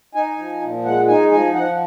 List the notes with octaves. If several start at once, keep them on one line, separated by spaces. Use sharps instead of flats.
D#4 G#5
F3
A#2
G#3 F#5
D#4 G#5
F3 G#5
F3 F#5